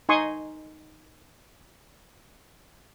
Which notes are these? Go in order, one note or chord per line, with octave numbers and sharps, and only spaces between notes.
D#4 G#5 C6 C#6 D#6